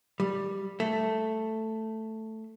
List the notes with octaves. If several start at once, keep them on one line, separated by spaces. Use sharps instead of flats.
G3
A3